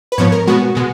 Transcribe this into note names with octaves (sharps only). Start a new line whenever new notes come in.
B4
G#2 F3 B3 C#5
A#4
B2 G#3 B3 F#4
B2 G#3 B3